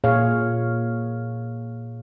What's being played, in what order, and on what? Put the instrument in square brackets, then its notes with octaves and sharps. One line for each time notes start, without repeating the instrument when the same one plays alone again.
[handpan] A#2 G#4 C#5 F5